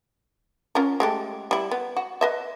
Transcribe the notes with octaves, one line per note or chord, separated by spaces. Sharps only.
C#4 F4 A#4
G#3 A3 G4
G3 E4
B3
F#4
B4 D#5 E5